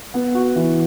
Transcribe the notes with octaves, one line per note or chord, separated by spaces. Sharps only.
B3
F#4
E3